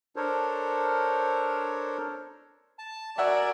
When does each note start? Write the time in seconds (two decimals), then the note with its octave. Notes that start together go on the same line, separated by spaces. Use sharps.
0.16 D4 A4 A#4 C5 C#5
2.79 A5
3.18 F#4 A#4 D5 E5 F#5 G#5 E6